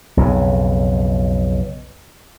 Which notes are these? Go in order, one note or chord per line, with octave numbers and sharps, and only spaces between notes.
B1 F2 C#3